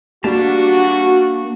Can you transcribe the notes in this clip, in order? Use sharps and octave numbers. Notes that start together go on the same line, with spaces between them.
G3 A#3 D4 F#4 A5 A#5